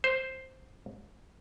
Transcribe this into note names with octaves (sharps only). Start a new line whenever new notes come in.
C5